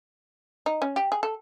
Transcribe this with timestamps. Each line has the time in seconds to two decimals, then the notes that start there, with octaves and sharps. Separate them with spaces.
0.66 D#4
0.82 C#4
0.96 G4
1.12 G#4
1.23 A4